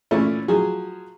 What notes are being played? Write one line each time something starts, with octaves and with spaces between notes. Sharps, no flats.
A#2 E3 A3 C#4 E4
F3 F#3 G#4